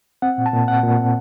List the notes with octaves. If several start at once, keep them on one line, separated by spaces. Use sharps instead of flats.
C4 F#5
A#2
A5
A#2
C4 F#5
A#2
C4